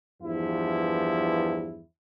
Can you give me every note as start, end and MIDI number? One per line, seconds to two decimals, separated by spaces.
0.22 1.83 40
0.22 1.83 43
0.22 1.83 53
0.22 1.83 64